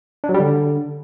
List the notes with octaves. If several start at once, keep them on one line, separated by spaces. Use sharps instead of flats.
D4
F#3
G3
D3